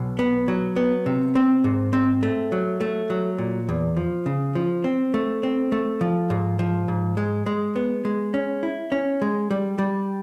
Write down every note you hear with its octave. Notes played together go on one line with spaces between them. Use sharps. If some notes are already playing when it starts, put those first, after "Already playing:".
Already playing: B1 B2
B3
F#3
B3
C3
C4
G#2
C4
A3
F#3
A3
F#3
A#2
E2
F3
C#3
F3
C4
A3
C4
A3
F3
G#2
F3
G#2
G#3
G#3
B3
G#3
C#4
E4
C#4
G#3
G3
G3